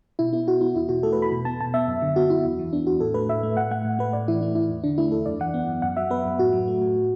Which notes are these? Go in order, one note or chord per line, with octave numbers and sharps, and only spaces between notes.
B2 E4
B3 E4
B2 F#4
B3 E4
E2 E4
B2 F#4
A3 A4
B4
E2 B5
B2
B3 A5
B2 A5
B3 E5
F#2
D3
B3 F#4
F#2 E4
E2
E3
B3 D4
E2 F#4
A2 A4
A3 B4
A2 E5
A3
A2 F#5
A3 F#5
A2
A3 B4
A2 D5
E3 E4
A3 E4
A2 E4
E2
D3 D4
A3 E4
E2 A4
F#2 D5
E3 F#5
B3
F#2
F#2 F#5
F#3 E5
B3 B4
F#2
A2 F#4
F#3
A3
A2